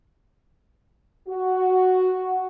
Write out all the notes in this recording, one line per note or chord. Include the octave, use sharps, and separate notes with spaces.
F#4